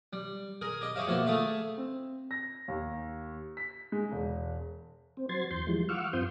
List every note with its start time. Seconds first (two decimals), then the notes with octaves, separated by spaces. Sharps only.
0.13 G3
0.61 G#4 A#4
0.81 G4 D#5
0.95 G4 G#4 C#5 E5 F5
1.08 B2 F3 A#3 E5
1.26 A3 G#4 A4 E5 F5
1.78 C4
2.31 A#6
2.68 D#2
3.57 B6
3.92 G#3
4.12 E1
5.17 C4
5.29 F#3 C5 C6 G#6 A6
5.51 E2 C6 G6
5.67 E3 F3 G3 G#3
5.89 F5 F#5 C#6 D6 E6 F6
6.13 F#2 C4 F4 C6 D#6 G6